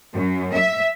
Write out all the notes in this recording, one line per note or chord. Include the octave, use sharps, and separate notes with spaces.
F#2
E5